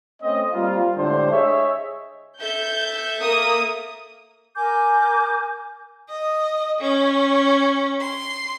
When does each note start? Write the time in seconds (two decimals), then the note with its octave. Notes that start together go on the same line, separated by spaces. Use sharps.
0.22 A3 C4 C#4 D#5
0.52 G3 A#3 C4 F4
0.96 A2 D3 G#3 D4 G4 C5
1.32 G#4 C#5 D#5 E5
2.40 A4 E5 G6
3.21 A#3 D#6
4.55 A#4 G#5 D6 G6
6.10 D#5
6.81 C#4
8.01 C6